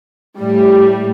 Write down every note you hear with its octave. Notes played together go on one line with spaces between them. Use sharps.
A2 G3